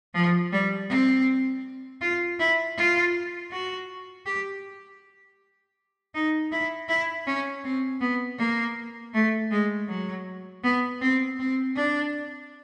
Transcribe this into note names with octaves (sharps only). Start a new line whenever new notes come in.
F3
G3
C4
F4
E4
F4
F#4
G4
D#4
E4
E4
C#4
C4
B3
A#3
A3
G#3
F#3
B3
C4
C4
D4